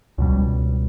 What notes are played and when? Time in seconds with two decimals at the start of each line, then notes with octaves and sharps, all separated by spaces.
0.18 C#2 B2 G3